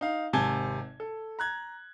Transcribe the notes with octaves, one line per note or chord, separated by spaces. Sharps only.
D#4 F5
G#1 C3 G#5 A5 G#6 G7
A4
A#5 F#6 G#6